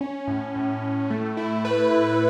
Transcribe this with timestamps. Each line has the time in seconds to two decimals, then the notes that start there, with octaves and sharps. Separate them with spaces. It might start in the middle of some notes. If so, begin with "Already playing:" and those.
0.01 C#4
0.27 A2
0.56 A2
0.82 A2
1.10 A3
1.37 E4
1.65 B4
1.91 E4